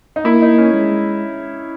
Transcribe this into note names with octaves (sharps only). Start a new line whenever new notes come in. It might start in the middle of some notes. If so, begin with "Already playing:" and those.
D#4
A#3 E4
D#4
C#4
G#3